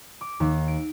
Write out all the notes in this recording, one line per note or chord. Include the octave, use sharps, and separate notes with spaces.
D6
D#2
D7